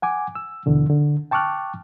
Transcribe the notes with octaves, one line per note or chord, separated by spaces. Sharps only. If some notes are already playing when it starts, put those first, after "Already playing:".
F#5 G#5 D6
E6
D#2 B2 D3 E3
D3
G5 A5 C#6 D6 F6 F#6